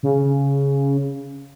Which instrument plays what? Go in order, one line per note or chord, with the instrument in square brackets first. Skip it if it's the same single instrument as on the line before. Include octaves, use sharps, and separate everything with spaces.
[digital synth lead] C#3